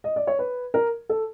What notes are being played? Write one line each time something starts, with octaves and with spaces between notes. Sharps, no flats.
D#5
D5
C#5
B4
A#4
A4